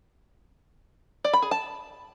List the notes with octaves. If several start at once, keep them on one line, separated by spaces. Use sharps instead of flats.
D5
B5
G#4
A5